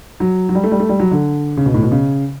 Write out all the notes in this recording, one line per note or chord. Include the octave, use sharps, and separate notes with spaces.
F#3
F#3
G3
A3
G3
A3
G3
F#3
D3
C#3
B2
A2
B2
C#3